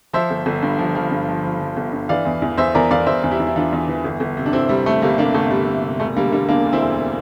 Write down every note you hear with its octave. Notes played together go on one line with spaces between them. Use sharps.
F3 C5 E5
G1
G1
G2
F3
F3
G2
F3
F3
F3
G1
G2
E3 D5 F5
E2
E2
E2 C5 E5
E2 A#4 D5
E2 D5 F5
E2 C5 E5
E2
E4 G4
E2
E4
E3 D4 F4
E2
E3
G1
G1
C3
D4
G1 C4 E4
C3 G3
C3 A3
G1 G3 A#3
C3 A#3 D4
G1 A3
G1 G3
C3
C3
E1 A3
D3 G3 A#3
D3 G3 A#3
E1 A#3 D4
D2
C4 E4
E1